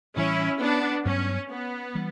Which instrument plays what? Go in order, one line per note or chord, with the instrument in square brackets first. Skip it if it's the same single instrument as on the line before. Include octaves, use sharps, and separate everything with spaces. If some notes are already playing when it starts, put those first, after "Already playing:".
[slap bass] A2 E3 G3 [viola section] C#4 E4
[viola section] B3 D4
[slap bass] G2 F#3 B3 [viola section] C#4
[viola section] B3
[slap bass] E3 G3